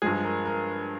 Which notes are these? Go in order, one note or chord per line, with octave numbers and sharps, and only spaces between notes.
G2 F3 G#3 G#4
A#4
A#4